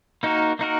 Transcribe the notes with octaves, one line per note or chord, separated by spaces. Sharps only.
A#3 D#4 F#4 A#4
A#3 D#4 F#4 A#4